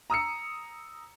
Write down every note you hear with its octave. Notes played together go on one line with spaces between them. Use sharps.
A#5 D#6 E6 C#7